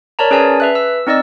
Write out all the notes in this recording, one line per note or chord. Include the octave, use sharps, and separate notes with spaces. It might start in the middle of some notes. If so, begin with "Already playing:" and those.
A#4 C#5 D5 A5 A#5
C#4 G#4 B4 D5 G#5 A5
B4 E5 F#6
E6
C4 D#4 D5 D#5 E6